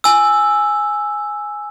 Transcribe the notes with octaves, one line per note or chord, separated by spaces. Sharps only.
G#5 E6